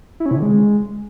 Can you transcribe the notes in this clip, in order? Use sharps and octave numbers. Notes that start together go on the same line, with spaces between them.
E4
C#4
C3
D3
G#3